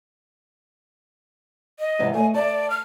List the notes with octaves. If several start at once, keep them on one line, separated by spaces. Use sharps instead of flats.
D#5
G#2 C3 E3
A3 D#5 G#5
D5 A5
F6